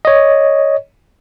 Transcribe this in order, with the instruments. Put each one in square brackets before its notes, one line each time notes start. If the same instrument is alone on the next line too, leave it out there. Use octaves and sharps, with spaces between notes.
[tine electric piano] C#5 D#5